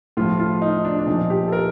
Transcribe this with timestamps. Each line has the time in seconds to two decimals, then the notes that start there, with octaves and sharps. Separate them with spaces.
0.17 A2 F3 F4
0.40 F4
0.62 D#4
0.85 D4
0.99 D4
1.07 A#2 F3 D#4
1.30 G4
1.48 A4
1.52 A#4